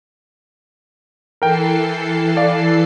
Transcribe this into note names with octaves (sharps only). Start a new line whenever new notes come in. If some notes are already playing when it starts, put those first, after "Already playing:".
E3 A4 A#4 G5 C7
D5 F5